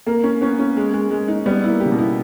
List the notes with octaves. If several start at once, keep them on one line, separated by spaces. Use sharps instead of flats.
A#3 A#4
C#4
B3 C#4
C#4
G#3
G#3
G#3
D#4
G3 B3
A#3 E4
G4
C#3
B2
E4